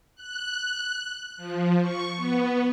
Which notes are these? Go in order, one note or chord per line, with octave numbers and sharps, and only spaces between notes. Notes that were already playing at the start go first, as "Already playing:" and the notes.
F#6
F3
C#6
B3